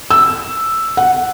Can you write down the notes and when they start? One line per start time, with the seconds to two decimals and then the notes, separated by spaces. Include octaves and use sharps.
0.11 E6
0.97 F#5